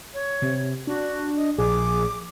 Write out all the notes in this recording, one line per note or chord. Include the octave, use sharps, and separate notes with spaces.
C#5
C3
D4 F#4
D#5
A#1 G#4 D6